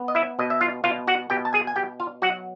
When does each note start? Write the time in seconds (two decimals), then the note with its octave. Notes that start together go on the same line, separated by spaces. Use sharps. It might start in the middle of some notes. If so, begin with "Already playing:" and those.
Already playing: B3
0.08 D#5
0.15 E4 E5
0.39 B2 D#5
0.50 E5
0.61 F4 F5
0.84 B2 F4 F5
1.07 F#4 F#5
1.30 B2 G4 G5
1.45 A5
1.53 G#4 G#5
1.67 G#5
1.76 B2 G4 G5
2.00 F4 F5
2.22 F#3 F#4 F#5